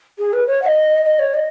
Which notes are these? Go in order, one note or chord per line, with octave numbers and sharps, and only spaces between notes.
G#4
B4
C#5
F#5
D#5
D#5
C#5
D#5